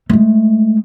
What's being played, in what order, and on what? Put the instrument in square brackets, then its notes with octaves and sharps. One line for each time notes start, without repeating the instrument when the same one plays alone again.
[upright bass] G#3 A3